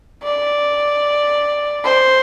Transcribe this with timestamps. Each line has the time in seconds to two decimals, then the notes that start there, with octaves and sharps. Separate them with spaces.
0.23 D5
1.84 C5